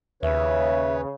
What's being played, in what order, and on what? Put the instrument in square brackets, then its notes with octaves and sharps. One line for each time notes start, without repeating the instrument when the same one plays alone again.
[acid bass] D#2 [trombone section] C#3 [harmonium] B4 C#5 [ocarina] E5